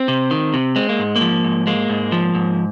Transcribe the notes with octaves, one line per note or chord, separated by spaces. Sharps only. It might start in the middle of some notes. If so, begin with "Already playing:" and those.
Already playing: C4
C3
D#3
C3
G#3 C4
A#3
G#2
A#3
F3
G#2
G#3 A#3
G#2
F3
G#2